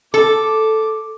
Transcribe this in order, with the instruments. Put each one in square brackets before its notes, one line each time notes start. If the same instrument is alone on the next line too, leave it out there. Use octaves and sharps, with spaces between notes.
[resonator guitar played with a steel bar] A4 [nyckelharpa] D6